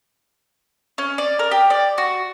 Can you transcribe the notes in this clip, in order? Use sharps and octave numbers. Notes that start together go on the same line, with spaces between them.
C#4
D5
A#4
G4
D5
F#4